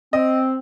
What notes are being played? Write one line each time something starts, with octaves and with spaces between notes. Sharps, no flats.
C4 D#5